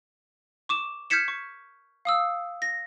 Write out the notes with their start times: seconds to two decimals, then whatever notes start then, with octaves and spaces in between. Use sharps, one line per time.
0.69 C#6 D6 E7
1.10 F6 G6 G#6 B6 C#7 E7
1.28 C#6
2.05 F5 D#6 E6
2.62 A#6